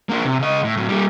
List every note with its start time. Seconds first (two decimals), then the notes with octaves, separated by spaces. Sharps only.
0.09 A#3 D4
0.25 C3
0.39 C#3 D#5
0.64 A2
0.76 A2 F#3
0.89 G3 A#3